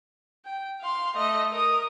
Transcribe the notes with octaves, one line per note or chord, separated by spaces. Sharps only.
G5
F5 C6
A3 D#5
A#4 D#6